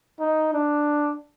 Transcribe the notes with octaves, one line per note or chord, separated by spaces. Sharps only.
D#4
D4